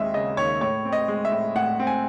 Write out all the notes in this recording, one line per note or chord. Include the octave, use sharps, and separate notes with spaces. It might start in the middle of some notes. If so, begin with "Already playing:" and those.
Already playing: D#2 G#3 C4 D#5 E5
C#3 D#5
D#2 C#5
A2 C#5
C4
D#5
G#3
E5
A2
A2 F#5
C4
G#5